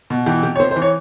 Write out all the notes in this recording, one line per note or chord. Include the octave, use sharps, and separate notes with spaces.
B2
E3 G4
C3 G4
C#5
C3 C5
C5
E3
C#5